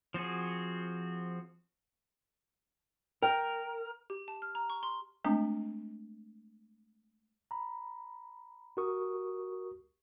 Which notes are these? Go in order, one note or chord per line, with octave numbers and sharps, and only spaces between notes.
F3 C4 F#4 G#4
A#4 G5
G4
A5
F6
A#5
C#6
C6
G#3 A3 C4 D4 A#5
A#5 B5
F#4 G4 A#4 C#6 D#6